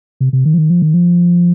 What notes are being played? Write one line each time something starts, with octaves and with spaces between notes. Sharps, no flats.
C3
C3
D#3
F3
D#3
F3
D#3
F3